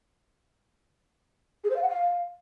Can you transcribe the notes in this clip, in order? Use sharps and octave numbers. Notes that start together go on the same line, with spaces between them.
G#4
C5
F5
F#5
F5